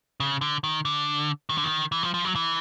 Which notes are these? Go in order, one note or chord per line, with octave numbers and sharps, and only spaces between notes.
C#3
D3
D#3
D3
D#3
D3
D#3
E3
F3
F3
F#3
E3